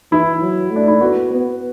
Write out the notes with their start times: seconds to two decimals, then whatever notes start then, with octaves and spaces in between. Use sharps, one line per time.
0.11 E3 E4
0.42 F#3
0.71 A3
0.76 D4
0.88 E4
1.01 B3 F#4
1.31 B3